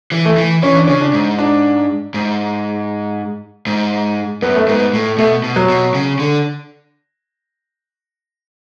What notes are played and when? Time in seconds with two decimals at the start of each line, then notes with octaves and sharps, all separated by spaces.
0.12 E3
0.25 A3
0.38 E3
0.63 E3 C#4
0.75 D4
0.87 C#3 C#4
1.01 D4
1.13 G#2
1.39 D4
2.14 G#2
3.67 G#2
4.42 F#2 B3
4.56 A3
4.68 G#2 B3
4.93 A2
5.18 B2 A3
5.44 B2
5.56 F#3
5.69 B2
5.94 C#3
6.19 D3